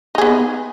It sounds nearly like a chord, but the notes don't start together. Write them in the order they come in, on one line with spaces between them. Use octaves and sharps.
D#4 G#4 B3